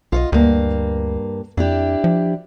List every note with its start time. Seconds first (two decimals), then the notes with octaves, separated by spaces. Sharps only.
0.12 B1 F4 C#5 D#5
0.32 D2 G2 A#3
1.57 F2 D4 E4 G4
2.04 F3